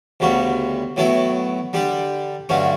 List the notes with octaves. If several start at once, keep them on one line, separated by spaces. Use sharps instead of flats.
D2 C#3 G3 B3 F#4
A2 F#3 B3 E4 A4
D3 G3 D4 G4
G2 D3 F#3 A3 C#4